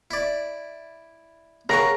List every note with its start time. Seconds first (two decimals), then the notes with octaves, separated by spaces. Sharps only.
0.11 E4 D5
1.69 C#3 A#4 F#5 C#6